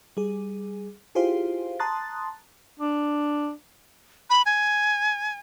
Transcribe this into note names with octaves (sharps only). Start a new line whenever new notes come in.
G3 G#4
E4 F4 G4 G#4 C5 F5
A5 A#5 C6 D#6 F#6 A6
D4
B5
G#5